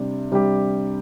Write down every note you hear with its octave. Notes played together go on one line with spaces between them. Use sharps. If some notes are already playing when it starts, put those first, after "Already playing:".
Already playing: C3 G3 D4 G4
C3 G3 D4 G4